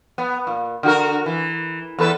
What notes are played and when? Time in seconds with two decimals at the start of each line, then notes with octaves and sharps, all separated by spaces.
0.18 B3
0.47 A#2
0.83 D3 F#4 A#4
1.26 E3
1.99 E2 A4 B4